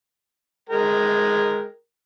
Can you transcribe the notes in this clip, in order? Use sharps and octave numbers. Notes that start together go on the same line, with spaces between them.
G#3 A#4 G5